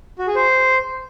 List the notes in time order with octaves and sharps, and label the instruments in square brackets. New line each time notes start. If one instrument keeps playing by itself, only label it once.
[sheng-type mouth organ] F#4
G#4
C5